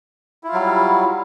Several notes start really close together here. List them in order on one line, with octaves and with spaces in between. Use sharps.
E4 F4 F#3 G3